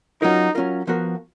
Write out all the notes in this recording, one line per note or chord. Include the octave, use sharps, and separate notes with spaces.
F#3 C#4 D#4 F4 A#4
F#3 C#4 F4 A#4
F3 B3 F#4 A#4